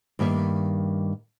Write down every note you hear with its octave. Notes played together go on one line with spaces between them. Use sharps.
G2 D#3 G3 A#3 E5